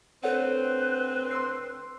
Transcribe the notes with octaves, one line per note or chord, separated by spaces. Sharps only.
D2 C4 A4 B4 C#5 F#5
C6 E6 C7